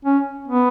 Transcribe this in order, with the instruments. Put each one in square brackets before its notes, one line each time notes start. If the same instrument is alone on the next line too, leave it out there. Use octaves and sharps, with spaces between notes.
[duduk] C#4
B3